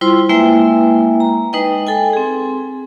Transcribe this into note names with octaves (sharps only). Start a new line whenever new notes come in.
G3 E4 F4 C5 C6
G#3 A#3 E4 B4 E5 G5
A#5
G#3 D#4 B4 D#5 G5
A4 G5 G#5
C4 G#4